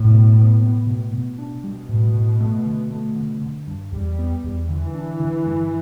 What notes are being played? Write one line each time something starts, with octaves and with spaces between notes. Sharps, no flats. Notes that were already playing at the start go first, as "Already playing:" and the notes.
Already playing: A2
B2
B3
B3
B2
B2
D4
B2 G3
A2
A2
A3
D3
A3
D3
D3
G2
E2 G3
B3
E2
D3 E3
D4
D3
G2